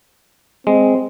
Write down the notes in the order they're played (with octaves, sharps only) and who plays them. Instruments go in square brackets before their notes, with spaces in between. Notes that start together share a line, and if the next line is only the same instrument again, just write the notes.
[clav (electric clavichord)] G#3 [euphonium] C4